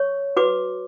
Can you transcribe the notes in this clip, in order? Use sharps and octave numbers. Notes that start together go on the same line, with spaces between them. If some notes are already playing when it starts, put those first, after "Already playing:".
Already playing: C#5 C#6
F#4 B4 D6